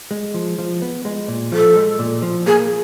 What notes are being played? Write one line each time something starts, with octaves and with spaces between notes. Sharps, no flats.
G#3
F3
F3
B3
G#3
A#2
F3 A4
G#3
A#2
F3
A#3 G#4